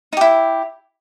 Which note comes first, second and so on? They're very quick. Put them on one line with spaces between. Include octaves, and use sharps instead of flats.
D#4 G4 E4